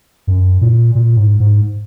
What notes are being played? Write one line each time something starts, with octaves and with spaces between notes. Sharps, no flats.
F#2
A#2
A#2
G#2
G#2